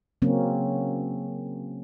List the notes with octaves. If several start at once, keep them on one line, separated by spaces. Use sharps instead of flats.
C#3 F#3 A#3 C4 C#4